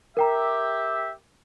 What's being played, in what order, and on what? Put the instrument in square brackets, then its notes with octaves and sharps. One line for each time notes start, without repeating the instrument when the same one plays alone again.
[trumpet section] G4 E5 [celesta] A#4 G5 A#5